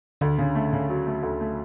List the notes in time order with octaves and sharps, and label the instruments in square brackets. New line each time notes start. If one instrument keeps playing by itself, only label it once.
[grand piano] D2 [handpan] D3
[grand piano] C#3
A3
C#3
F#3
A3
D2
A3